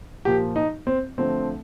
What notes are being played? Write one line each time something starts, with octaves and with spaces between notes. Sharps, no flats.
A#2 F3 A#3 G4
D#4
C4
D3 F3 A3 C4